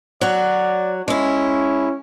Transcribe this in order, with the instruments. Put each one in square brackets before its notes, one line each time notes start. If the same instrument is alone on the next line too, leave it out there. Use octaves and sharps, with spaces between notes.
[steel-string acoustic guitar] F#3 F#4 [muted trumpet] D5
[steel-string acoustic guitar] G#3 E4 [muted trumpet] C#4